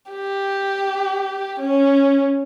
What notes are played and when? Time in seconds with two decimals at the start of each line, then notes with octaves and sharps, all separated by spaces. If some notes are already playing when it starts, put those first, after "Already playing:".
0.11 G4
1.60 C#4